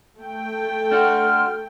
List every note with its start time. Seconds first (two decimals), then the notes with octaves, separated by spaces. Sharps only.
0.20 A3 A4 G5
0.92 D4 F#4 C6 F6